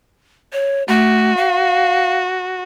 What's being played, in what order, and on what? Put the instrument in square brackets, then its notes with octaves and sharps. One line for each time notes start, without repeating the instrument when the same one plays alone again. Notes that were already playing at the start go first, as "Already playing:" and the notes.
[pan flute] C#5
[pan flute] A3 [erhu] F#4
[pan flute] F5